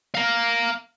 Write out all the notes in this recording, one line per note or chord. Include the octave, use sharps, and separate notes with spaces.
F5 A#5